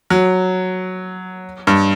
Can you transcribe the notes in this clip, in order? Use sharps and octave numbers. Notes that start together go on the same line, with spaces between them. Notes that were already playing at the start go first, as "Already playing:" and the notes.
F#3
G2